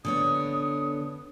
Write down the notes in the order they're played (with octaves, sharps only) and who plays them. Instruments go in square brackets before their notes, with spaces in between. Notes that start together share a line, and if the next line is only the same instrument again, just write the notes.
[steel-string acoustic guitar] D3 B3 C#5 [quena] D#6